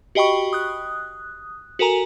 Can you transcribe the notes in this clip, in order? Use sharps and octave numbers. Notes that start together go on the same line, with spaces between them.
F#4 G4 D#5 G5 B5 C#6
D#6 F#6
F#4 A4 A#4 G#5 A#5